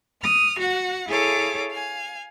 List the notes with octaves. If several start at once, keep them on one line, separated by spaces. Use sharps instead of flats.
D#6 F6
F#4 F#5
E4 G#4 A4 C#5 F5 D6
F5 G#5